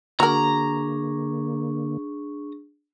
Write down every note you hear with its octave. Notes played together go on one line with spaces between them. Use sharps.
D3 A#3 D4 F#4 G#4 A#4 A#5 C#6